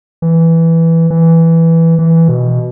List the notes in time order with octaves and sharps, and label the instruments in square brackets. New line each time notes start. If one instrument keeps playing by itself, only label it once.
[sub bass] E3
E3
E3
B2